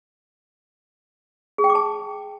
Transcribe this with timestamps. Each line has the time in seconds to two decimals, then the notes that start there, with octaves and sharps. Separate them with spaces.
1.58 G#4
1.64 G5
1.70 D6
1.75 A5